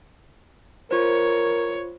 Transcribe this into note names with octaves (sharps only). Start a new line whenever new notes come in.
F4 A#4 C5 C#5